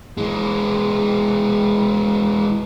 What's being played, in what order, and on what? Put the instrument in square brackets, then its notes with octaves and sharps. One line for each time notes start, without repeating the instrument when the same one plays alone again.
[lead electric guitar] E3 G#3